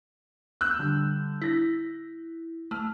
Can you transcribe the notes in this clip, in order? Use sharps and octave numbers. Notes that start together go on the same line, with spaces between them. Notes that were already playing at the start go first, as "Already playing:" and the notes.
E6 F#6 G6
D3 G3
E4 A#6 B6
A3 F6